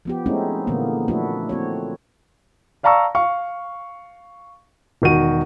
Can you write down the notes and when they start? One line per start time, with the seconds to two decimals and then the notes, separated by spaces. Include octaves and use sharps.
0.05 F3 B3 G4
0.26 G#3 A3 C4 C#4 D#4 E4
0.67 A#2 D3 E3 A#3 B3
1.08 F3 A3 D4 E4 F#4
1.49 C4 F#4 C#5
2.83 D5 F5 A5 A#5 C#6 E6
3.15 F5 C#6
5.02 E1 D#3 F#4 D#7